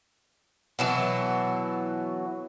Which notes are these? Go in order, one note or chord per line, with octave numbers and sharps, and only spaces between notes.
B2 E3 F#3